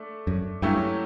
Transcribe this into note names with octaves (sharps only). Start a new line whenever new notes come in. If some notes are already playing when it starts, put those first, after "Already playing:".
Already playing: A3 D4
F#2
G2 F#3 A3 C#4 E4 G4